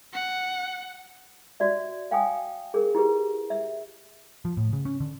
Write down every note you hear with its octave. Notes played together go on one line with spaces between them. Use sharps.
F#5
F#4 D5 E5
F5 G5 G#5 D#6
G#4 A#4
E4 G4 G#4 B4
E5
F3
A2
C#3
C#4
D3